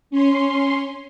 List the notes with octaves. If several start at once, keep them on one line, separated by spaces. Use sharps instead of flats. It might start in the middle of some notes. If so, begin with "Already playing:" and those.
C#4 C6